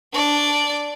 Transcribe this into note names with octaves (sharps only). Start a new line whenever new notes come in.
D4 D5